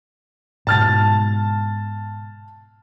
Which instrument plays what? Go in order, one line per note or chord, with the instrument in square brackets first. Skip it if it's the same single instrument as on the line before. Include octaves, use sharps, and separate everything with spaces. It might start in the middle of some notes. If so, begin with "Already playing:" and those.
[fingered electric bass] G#2 B2 G#3 [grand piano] A5 F6 A6